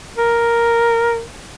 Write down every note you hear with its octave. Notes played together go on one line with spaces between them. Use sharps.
A#4